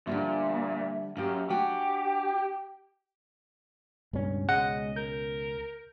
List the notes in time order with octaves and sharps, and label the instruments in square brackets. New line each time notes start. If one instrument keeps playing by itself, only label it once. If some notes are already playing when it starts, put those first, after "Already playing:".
[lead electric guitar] A#2 [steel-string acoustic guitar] D3 F3 G3 [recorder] E5
[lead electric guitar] F#2 [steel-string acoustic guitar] A#3 G4
[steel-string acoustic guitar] D4 F#4 G#5 [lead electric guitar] G4 [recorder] G5
[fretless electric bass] C#2 B2 C#4 [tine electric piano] G2
[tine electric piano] G#3 [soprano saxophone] D#5 [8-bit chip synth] F#5
[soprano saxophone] A#4 [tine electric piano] G6